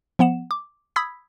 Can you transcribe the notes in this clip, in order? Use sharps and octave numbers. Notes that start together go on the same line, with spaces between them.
F3 B3 F#5 E7
D6
B5 D#6 E6 G#6 B6